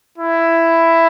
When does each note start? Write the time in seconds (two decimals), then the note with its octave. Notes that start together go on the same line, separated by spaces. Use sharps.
0.18 E4